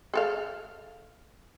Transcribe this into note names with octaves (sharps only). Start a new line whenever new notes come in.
G#4 A4 F5